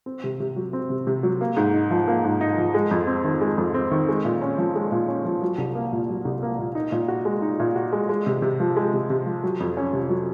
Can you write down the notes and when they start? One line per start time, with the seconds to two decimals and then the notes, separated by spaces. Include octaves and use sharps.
0.06 C4
0.24 C3
0.40 C3
0.56 F#3
0.73 C4
0.90 C3
1.07 C3
1.23 F#3
1.41 A#3
1.57 G#2
1.74 D#4
1.91 F3
2.08 A#3
2.24 G#2
2.41 D#4
2.58 F3
2.74 G#3
2.91 F2
3.07 C4
3.24 D#3
3.41 G#3
3.58 F2
3.74 C4
3.91 D#3
4.08 G#3
4.25 A#2
4.42 C#4
4.58 F3
4.75 G#3
4.92 A#2
5.08 C#4
5.25 F3
5.42 F#3
5.58 C2
5.75 A#3
5.92 A#2
6.09 F#3
6.25 C2
6.43 A#3
6.59 A#2
6.75 D#4
6.92 A#2
7.08 F#4
7.25 G#3
7.42 D#4
7.60 A#2
7.76 F#4
7.92 G#3
8.09 G#3
8.26 C3
8.42 C3
8.60 F3
8.77 G#3
8.93 C3
9.10 C3
9.26 F3
9.44 F#3
9.60 F2
9.77 C#4
9.93 C3
10.09 F#3